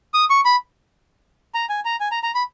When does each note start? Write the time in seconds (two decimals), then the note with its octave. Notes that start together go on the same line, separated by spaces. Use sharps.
0.14 D#6
0.30 C#6
0.45 B5
1.55 A#5
1.69 G#5
1.85 A#5
2.00 G#5
2.12 A#5
2.23 A#5
2.35 B5